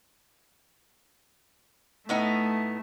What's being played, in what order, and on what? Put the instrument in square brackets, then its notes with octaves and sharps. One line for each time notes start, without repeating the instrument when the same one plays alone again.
[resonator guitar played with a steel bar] A2 B3 D#4 [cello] A3